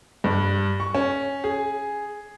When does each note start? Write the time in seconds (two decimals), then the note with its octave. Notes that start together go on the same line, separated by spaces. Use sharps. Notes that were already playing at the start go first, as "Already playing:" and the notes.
0.24 G2
0.80 C#6
0.95 C#4
1.44 G#4